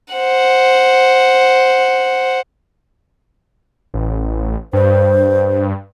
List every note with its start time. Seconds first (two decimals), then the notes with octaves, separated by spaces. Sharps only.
0.14 C5 F#5
3.94 A1
4.73 G2 C5